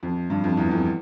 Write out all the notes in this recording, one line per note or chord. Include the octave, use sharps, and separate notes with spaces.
F2
G2
F2
E2
F2